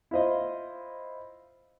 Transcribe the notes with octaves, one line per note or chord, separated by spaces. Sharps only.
E4 F4 C5 D#5